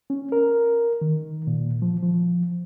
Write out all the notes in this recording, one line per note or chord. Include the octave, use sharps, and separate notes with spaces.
C#4
A#4
D#3
A#2
F3
F3